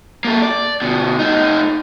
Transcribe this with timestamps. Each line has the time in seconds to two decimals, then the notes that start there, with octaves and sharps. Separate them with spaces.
0.25 A#3 A4
0.42 D5
0.82 D2 B2
1.19 A3 D#4